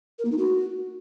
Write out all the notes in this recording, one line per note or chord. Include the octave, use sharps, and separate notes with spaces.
A#4
A#3
D#4
F#4